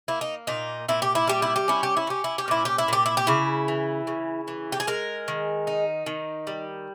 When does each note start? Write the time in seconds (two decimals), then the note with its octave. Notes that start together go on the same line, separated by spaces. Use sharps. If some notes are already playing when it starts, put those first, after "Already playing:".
0.08 A#3 E4
0.21 D#4
0.47 A#2 D#4
0.88 A#2 E4
1.02 G4
1.15 E4
1.27 G3 G4
1.42 E4
1.56 G4
1.68 C#4 E4
1.83 G4
1.97 E4
2.07 C#4 G4
2.24 E4
2.38 G4
2.48 A#2 E4
2.65 G4
2.78 E4
2.88 A#2 G4
3.06 E4
3.17 G4
3.27 C#3 E4
3.68 E3
4.07 C#3
4.48 E3
4.72 G4
4.80 G#4
4.87 G#3 A#4
5.28 D#3
5.67 D#4
6.06 D#3
6.47 G3